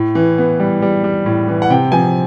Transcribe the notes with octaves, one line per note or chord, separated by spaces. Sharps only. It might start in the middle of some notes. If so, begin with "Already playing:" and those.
Already playing: A2
E3
B3
G3
G3
G3
A2
E3
F#5
C3 G5
F3 G#5